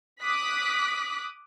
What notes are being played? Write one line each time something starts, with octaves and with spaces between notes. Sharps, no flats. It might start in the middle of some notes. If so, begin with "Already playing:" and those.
D6 D#6 F#6 B6